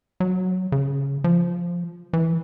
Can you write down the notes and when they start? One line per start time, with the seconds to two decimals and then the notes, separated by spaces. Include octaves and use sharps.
0.20 F#3
0.72 C#3
1.24 F3
2.13 E3